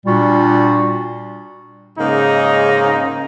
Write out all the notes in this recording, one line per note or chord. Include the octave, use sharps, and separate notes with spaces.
A#2 G3 D4 F4 F#4
G#2 C#3 A#3 D#4